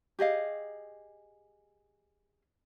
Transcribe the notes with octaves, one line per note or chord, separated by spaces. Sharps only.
G4 G#4 D#5 F5